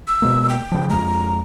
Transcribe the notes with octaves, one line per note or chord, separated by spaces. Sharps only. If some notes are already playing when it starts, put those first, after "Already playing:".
E6
B2 G#3 A#3
G5
C#3 F3
F2 G#3 A#5